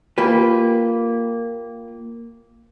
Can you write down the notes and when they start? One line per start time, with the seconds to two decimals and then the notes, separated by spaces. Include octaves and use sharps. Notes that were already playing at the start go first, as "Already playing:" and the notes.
0.18 A#3 F4 G4 B4